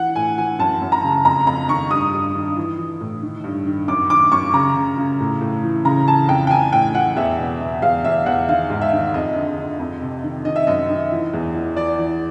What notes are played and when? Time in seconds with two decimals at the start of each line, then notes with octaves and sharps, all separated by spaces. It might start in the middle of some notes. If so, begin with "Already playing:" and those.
Already playing: E3 F#5
0.16 A2 G#5
0.38 E3 G#5
0.59 F#2 A5
0.81 F#2
0.92 A#5
1.04 C#3
1.25 F2 A#5
1.47 F2 A#5
1.69 D#3 C#6
1.91 G2 D#6
2.13 G2
2.35 D#3
2.56 E3
2.79 E3
3.01 A2
3.22 D#3
3.44 G2
3.66 D#3
3.88 F#2 D6
4.10 D#3 D6
4.32 F#2 C#6
4.54 C#3 A#5
4.76 C#3
4.98 C#3
5.20 A2
5.41 A2
5.64 E3
5.85 C#3 A#5
6.07 E3 A5
6.29 F2 G5
6.47 G5
6.50 E3 G#5
6.73 A2 G5
6.95 E3 F#5
7.16 E2 E5
7.39 B2
7.60 B2
7.82 E2 F5
8.05 E2 E5
8.26 E2 F#5
8.49 D#3 F5
8.70 G#2
8.81 E5
8.93 D#3
9.14 F2 D#5
9.35 D3
9.58 D3
9.79 F2
10.02 C3
10.23 D#3
10.45 D#3 D#5
10.56 E5
10.67 F#2 D#5
10.90 D#3
11.12 E3
11.33 E2
11.55 E3
11.77 E3 D5
11.99 E3